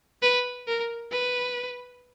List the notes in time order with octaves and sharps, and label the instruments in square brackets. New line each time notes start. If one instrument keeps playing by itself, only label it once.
[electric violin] B4
A#4
B4